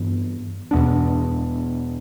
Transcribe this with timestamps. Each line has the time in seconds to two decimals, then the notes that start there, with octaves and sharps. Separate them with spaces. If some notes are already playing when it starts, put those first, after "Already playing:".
Already playing: G2 E3 B3
0.71 E2 B2 B3 D4